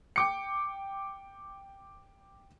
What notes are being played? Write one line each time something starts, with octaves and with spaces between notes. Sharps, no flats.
G5 D6 C#7